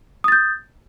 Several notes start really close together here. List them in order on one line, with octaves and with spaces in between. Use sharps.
D#6 A6 G6